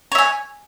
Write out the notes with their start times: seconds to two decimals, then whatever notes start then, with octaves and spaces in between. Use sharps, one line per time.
0.12 C#5
0.15 E5
0.18 G#5